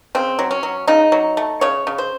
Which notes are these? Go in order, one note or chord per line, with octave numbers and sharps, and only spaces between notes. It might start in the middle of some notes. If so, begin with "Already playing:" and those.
C#3 C4
F#3
C#4
F#3
C#3 D#4
F#3
A3
C#3 C#5
C#3
C5